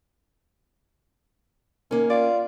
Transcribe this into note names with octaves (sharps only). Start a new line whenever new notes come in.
D#3 A#3 C#4
F4 D5